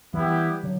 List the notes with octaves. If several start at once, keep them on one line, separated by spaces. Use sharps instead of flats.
E3 G3 B3 E4 G4
D3 F#3